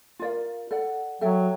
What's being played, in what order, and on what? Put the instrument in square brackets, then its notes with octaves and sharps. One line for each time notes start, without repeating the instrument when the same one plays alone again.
[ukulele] F4 A#4 D5 F5
A4 D5 F#5
[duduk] F#3 [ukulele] A4 C#5 E5 G5